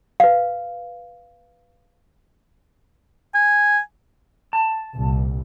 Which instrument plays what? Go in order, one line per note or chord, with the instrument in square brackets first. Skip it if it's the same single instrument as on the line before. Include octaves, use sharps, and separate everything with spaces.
[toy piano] B4 F5
[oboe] G#5
[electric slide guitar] A5
[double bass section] C2 A#2